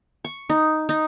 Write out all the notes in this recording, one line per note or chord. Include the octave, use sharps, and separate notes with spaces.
C#6
D#4
D#4